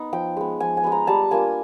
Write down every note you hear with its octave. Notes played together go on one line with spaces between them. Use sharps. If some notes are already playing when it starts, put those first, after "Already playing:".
Already playing: B3 D#4
F3 G5
G#3 B3
F3 G#5
G#5
G#3 B3
A#5
G3 A5
A#3 D4 F4 G#5